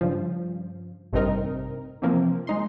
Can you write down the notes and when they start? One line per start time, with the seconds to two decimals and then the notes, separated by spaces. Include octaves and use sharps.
0.01 G2 C#3 F3
1.13 A1 G2 C3 C4 D#4 A#4
2.02 C3 E3 F3 A#3 C4
2.47 G#3 D#4 C6